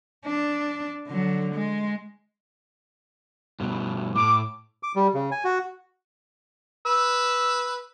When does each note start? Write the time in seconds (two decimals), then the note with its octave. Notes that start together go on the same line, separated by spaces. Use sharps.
0.25 D4
1.07 D3 F#3
1.55 G#3
3.60 G2 B2
4.16 A2 D6
4.83 D6
4.96 G3
5.14 C#3
5.32 G#5
5.44 F#4
6.86 B4 E6